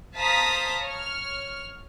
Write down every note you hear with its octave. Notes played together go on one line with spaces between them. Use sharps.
C5 F5 A5 A#5 D#6 B6
C#5 F6